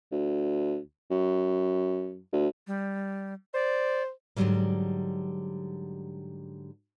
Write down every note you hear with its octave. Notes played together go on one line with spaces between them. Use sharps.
D2
F#2
D2
G3
C5 D5
G#2 D3 D#3 F#3 G3 A#3